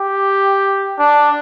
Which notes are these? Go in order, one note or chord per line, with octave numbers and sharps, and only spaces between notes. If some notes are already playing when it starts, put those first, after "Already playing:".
Already playing: G4
D4